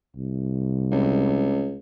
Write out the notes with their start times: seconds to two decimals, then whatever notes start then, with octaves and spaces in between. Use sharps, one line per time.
0.17 C2
0.92 C#2